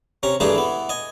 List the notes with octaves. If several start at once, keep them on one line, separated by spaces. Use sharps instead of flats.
C3 C#4 A#5
G2 E3 A3 D4 G#4 A#5
E3 B3
D#5 G#5